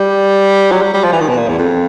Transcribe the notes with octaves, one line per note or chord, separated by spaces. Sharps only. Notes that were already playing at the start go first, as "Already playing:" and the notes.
Already playing: G3
F#3
G3
G3
F3
E3
D#3
B2
A#2
E2
F2